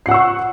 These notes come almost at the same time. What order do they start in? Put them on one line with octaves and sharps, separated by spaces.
C7 F#5 E6 C#6